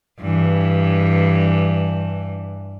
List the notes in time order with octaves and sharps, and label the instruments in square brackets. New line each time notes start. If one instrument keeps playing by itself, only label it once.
[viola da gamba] G2 E3